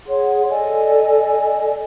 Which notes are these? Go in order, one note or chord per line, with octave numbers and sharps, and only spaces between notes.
G#4 C#5 F#5 C6
A4 D5 D#5 G#5